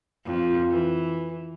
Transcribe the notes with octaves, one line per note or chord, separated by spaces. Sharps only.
F2
E3